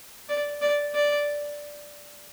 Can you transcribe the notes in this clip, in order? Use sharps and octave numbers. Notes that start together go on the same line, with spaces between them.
D5
D5
D5